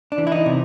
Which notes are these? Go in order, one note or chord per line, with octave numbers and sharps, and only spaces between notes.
D4
E3
E4
D#4
C3